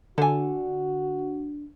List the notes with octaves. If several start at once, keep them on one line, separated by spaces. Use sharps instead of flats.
D3 D4 F#4 A4 G#5